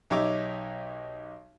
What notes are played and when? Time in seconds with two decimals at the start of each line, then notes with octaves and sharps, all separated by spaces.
0.10 B1 D#4 G4 C#5 E5 D6